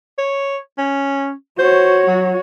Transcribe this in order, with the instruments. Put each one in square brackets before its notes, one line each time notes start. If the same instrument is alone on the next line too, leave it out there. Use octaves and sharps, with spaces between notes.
[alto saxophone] C#5
C#4
[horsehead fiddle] F#4 C#5 [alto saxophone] C5
[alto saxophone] F#3